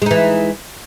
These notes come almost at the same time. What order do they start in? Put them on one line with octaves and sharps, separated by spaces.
G#3 D#4 E3